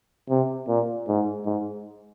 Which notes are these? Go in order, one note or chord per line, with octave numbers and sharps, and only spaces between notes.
C3
A#2
G#2
G#2